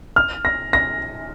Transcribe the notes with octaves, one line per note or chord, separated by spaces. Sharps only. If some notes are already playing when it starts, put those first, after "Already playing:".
F6
A#6
A#6